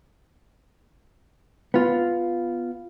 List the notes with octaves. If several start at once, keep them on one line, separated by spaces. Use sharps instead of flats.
B3 F4